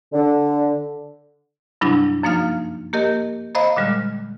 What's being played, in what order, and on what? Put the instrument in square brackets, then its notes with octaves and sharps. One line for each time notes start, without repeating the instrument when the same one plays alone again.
[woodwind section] D3
[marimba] G2 C3 F#3 G3 D4 E4
F#2 F3 A#3 D#4 F5 F6
A#3 G4 A#4 D#5
C5 D#5 F5 A#5 B5
A#2 D3 G3 G#3 F6